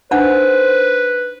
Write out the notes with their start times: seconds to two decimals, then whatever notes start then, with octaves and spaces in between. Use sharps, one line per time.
0.11 D4 D#4 B4 C5 F#5